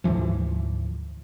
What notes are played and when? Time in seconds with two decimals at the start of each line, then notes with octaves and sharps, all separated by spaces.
0.04 D2 G#2 E3 F3